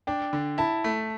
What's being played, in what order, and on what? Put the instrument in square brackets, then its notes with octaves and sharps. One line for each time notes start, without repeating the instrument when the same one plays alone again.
[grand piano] D4 [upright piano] G5
[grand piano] D3
[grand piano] E4 [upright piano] A5
[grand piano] A3